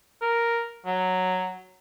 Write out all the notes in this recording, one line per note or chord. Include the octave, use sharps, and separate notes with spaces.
A#4
F#3